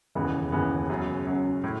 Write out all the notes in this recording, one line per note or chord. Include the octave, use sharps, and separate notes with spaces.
E1 D#2 C#3 E3 B3
E1 D#2 C#3 E3 B3
F#2 C#3 F#3
F#2 C#3 F#3
A2